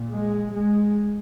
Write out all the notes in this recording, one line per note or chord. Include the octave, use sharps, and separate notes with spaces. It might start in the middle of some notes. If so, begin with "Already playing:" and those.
Already playing: A#2
G#3
G#3